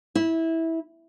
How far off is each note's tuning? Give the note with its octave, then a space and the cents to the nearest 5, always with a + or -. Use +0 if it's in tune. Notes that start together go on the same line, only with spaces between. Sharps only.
E4 -15